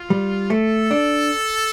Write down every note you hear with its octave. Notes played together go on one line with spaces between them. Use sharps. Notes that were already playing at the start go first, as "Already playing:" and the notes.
Already playing: F4
G3
A3 A4
D4